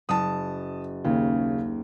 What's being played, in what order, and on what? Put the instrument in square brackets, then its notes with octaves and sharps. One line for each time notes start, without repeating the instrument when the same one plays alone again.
[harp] F#1 [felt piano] A5 D#6
[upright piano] D#2 [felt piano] C#3